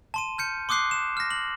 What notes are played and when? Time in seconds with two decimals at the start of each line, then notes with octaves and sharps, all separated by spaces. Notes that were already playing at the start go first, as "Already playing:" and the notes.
0.14 A5 C6 D#7
0.38 F6 G6 C#7
0.69 C6 D6 D#6 F#6 C7
0.91 E7
1.17 F6 A#6
1.31 F#7